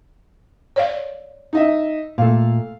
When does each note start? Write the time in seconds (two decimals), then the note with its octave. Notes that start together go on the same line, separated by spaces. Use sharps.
0.76 C#5 D5 F5
1.53 D#4 D#5 E5
2.18 A#2 A3 F5